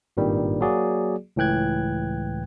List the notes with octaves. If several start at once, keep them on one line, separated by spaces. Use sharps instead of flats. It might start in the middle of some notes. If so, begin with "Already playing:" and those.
G#1 G2 A#2 D#3 G3
F#3 A#3 F#4 G#4 D5
C#2 A2 E3 G5 F#6 G#6